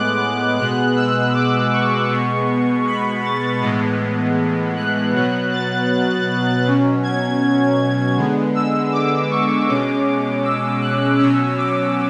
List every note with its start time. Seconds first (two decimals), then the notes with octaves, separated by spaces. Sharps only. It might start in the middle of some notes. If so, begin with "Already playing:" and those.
Already playing: A2 G#3 B3 D6 F#6
0.58 B2 G#3 B3 F#6
0.96 E6
1.34 D6
1.73 C#6
2.10 B2 G#3 B3
2.87 B5
3.24 A6
3.62 A2 E3 G#3 B3
4.76 F#6
5.13 B2 F#3 B3
5.52 A6
6.65 B2 F#3 C#4
7.03 G#6
8.17 D3 G#3 B3
8.55 E6
8.92 D6
9.30 C#6
9.67 B2 G#3 C#4 D6
10.44 E6
10.82 F#6
11.19 B2 F#3 C#4 E6
11.57 D6